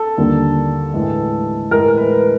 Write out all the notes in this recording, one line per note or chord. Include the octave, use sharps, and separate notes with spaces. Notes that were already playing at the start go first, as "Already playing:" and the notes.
Already playing: A4
D#2 D3 G3 A#3
A2 E3 G#3
A2 E3 G#3 A#4
B4